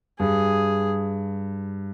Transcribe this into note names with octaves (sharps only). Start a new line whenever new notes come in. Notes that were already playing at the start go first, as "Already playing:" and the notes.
G2 G#4